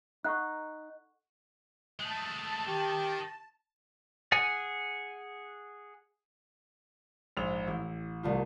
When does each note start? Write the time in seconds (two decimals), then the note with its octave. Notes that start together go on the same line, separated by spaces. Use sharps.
0.25 D#4 A4 F#5 C#6 F#6
2.00 G#3 A3 A5
2.68 D#3 G4
4.32 G#4 F#5 G#5
7.37 A#1 G#2 F7
7.67 A1 E4
8.23 C2 A3 F4